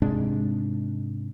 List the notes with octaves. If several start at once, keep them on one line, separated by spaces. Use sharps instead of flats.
G#2 C3 G#3 D4